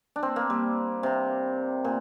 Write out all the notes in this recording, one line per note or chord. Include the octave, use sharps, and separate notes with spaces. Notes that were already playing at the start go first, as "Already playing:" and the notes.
D4
C4
A#3
G3
C3
A#2